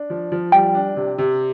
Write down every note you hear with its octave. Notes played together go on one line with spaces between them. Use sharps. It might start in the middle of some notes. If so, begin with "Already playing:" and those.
Already playing: D4
F3
F3
G3 G5
D4
C3
C3